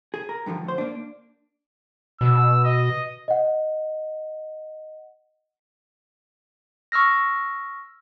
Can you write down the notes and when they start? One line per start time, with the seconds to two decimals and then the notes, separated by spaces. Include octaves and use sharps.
0.14 G#4
0.29 A#4
0.46 G2 D3 E3 F3
0.64 D2 C5
0.78 A#3 D4
2.21 B2 E6
2.64 D#5
3.28 D#5 F#5
6.92 C#6 E6 F6 A#6